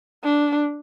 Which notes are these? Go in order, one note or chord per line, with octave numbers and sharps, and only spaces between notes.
D4